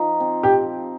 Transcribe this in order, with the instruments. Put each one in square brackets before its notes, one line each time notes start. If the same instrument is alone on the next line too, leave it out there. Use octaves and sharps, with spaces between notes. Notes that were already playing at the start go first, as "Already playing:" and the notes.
Already playing: [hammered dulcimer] F3 D#4
C4
[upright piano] G4